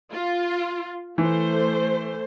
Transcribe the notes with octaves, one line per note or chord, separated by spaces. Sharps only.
F4
E3 A3 C5